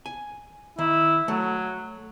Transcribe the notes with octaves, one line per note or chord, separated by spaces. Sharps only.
G#5
D#3 E4
F#3 A3